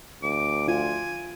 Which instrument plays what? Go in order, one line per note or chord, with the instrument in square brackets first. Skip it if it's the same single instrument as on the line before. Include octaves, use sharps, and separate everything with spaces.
[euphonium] D2 [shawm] D6
[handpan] F4 [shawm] G#5